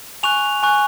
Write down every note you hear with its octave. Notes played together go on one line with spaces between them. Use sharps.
G#5 C#6 F#6 F7
G#5 C#6 F#6